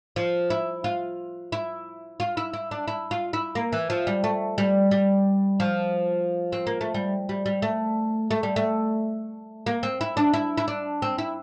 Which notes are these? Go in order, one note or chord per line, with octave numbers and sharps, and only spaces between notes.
F3
E4
F4
E4
F4
E4
E4
D4
E4
F4
E4
A#3
E3
F3
G3
A3
G3
G3
F3
C4
A#3
A3
G3
G3
G3
A3
A3
G3
A3
A#3
C4
E4
D4
E4
E4
D4
C4
E4